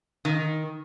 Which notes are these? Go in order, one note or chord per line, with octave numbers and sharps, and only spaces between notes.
D#3